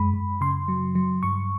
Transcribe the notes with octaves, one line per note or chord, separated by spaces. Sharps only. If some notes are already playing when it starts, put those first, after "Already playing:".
Already playing: F#2 G#3 B5
F#2
C#3 C6
F#3
F#3
G2 C#6